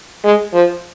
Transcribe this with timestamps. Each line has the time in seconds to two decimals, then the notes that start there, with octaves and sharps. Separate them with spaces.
0.24 G#3
0.54 F3